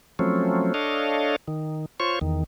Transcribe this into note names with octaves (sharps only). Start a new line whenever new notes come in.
F3 F#3 A3 C4 C#4
D4 A4 C#5 D#5 F5
D#3
F4 C5 C#5 C#6
E2 D#3